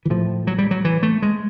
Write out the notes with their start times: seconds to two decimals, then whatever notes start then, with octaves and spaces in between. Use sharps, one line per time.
0.05 E3
0.10 A2 F3
0.47 F#3
0.58 G3
0.71 F#3
0.85 E3
1.03 A3
1.22 G#3